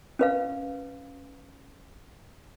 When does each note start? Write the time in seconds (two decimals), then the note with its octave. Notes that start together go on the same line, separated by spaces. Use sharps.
0.19 C#4 B4 F5